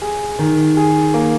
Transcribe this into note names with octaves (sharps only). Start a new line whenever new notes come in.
G#4
D#3
G#4
A#3